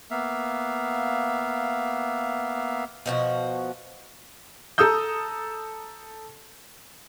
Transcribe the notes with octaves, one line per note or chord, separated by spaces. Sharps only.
A#3 B3 E5 F5
B2 F3 F#4
A4 A#5 D#6 E6 G6